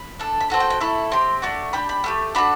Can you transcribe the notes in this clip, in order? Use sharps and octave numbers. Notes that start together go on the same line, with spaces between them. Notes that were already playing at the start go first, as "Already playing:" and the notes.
Already playing: B5
D4 A4
B5
C4 F#4 A4 A5
G5
G5
A3 E4 A4 B5
C4 G4 C6
A3 D4 F#4 D6
D4 G4 B5
B5
A3 D4 G4
D4 F#4 A4 B5